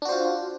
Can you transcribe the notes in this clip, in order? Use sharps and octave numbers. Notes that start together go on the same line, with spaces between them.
D4 F4 F#4 C5